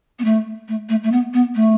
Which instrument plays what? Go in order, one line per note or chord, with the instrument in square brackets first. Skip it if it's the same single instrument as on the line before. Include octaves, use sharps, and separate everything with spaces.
[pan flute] B3
A3
A3
A3
A3
B3
B3
A3